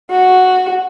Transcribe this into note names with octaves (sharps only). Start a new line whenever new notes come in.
F#4